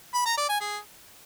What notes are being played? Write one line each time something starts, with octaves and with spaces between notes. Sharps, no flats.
B5
A#5
D5
G#5
G#4